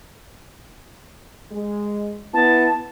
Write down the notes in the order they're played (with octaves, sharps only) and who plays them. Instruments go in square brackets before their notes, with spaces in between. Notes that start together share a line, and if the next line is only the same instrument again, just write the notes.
[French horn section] G#3
[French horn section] B3 E4 [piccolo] A5